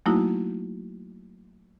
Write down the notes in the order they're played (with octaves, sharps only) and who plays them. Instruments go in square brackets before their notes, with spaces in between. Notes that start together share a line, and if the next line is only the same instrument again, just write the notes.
[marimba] F#3 A3 A#3 D#4 E4 F#4